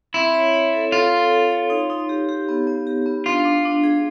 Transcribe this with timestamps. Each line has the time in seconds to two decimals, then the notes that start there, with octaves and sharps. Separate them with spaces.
0.14 C4 E4
0.34 C#5
0.54 C#5
0.73 A4
0.92 F4 A4
1.12 A4
1.31 A4
1.51 C#5
1.70 D#4
1.90 D#4
2.09 G4
2.29 G4
2.49 B3
2.67 B3
2.87 G4
3.06 B3
3.26 D4 F4
3.45 D4
3.65 D4
3.84 G#4